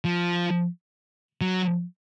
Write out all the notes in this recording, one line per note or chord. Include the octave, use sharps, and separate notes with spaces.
F3
F#3